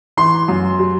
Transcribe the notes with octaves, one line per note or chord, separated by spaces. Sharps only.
E3 C6
F#2
F#3